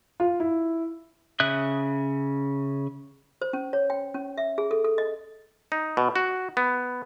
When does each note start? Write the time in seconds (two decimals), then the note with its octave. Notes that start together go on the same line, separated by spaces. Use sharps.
0.20 F4
0.40 E4
1.40 C#3 E5 D#6 F#6
3.42 C5
3.53 C#4
3.73 C#5
3.90 G5
4.14 C#4
4.37 E5
4.58 G#4
4.71 A4
4.84 A4
4.98 D#5
5.72 D#4
5.97 B2
6.16 F#4
6.57 B3